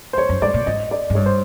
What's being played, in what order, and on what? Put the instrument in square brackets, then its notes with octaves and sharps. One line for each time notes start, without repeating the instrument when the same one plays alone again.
[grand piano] C5
[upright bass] F2 [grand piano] C#5
[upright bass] F#2
[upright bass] G#2 [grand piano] D5
[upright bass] A#2
[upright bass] G#2 [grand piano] D#5
[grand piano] D5
[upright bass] G#2
[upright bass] G2 [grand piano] C#5
[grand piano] C5